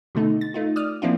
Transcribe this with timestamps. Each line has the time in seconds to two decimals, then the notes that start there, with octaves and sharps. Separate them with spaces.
0.15 B2 D3 A3 D#4
0.41 A6
0.54 A3 D#4 F4
0.76 D5 D#6 F6
1.02 F3 A#3 C4 D4 E4 F4